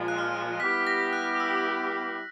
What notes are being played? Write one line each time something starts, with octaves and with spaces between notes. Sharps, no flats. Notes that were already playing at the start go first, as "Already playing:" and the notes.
Already playing: A#2 F3 G#3
F#6
F6
G3 B3 E4 G4 B6
A#6
F#6
E6